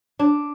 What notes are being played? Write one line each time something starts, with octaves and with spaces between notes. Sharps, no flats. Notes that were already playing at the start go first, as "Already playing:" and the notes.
D4